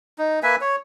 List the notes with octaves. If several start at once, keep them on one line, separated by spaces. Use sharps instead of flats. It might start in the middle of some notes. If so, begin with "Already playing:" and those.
D#4
A#3 B4 E5 G#5
C#5